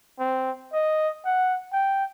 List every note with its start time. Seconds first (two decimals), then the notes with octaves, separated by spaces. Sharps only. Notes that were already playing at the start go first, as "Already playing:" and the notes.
0.19 C4
0.73 D#5
1.25 F#5
1.73 G5